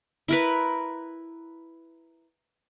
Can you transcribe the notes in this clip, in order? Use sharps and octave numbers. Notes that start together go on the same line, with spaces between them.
E4 A#4 B4